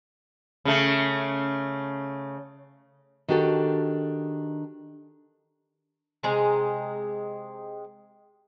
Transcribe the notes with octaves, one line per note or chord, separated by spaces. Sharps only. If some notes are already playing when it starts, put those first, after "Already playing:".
C#3 A3
D#3 D4 F#4 G4 A4
C3 G#3 A#5